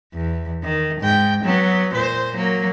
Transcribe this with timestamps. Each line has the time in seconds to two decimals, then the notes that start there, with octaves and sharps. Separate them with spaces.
0.14 E2
0.63 D#3
1.00 G#2 G5
1.44 F#3 B3
1.92 A#2 C5
2.34 F#3 A#3